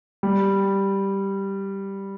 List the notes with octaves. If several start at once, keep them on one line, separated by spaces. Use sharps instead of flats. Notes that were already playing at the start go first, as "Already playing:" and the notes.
G3